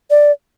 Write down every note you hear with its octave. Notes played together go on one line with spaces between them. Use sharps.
D5